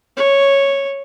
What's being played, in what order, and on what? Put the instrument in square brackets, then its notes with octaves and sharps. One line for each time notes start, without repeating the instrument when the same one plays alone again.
[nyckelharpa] C#5